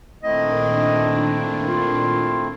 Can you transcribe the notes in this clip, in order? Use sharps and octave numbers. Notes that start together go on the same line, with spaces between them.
A#2 D#3 A3 C4 D4 E4 D#5
F4